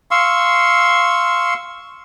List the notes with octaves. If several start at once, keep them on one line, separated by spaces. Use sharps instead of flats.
F5 C6 C#6 E6